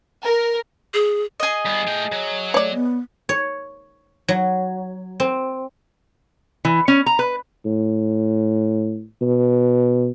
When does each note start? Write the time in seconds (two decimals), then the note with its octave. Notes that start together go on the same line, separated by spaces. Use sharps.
0.23 A#4
0.94 G#4
1.40 G#4 D#5
1.66 G2 B3
1.88 A3 G5
2.12 F#3
2.54 A3 C#5 D5
2.74 B3
3.29 C#5
4.28 F#3
5.20 C4
6.65 E3
6.88 C#4
7.06 A#5
7.19 B4
7.65 A2
9.21 B2